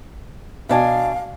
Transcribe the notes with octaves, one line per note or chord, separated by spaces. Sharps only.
B2 D4 F5 G#5